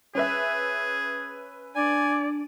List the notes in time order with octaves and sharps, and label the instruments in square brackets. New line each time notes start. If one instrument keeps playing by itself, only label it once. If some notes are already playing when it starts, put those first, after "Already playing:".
[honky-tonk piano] C#4 B4 E5 [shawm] G#4
[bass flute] D4 [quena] D5 [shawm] G#5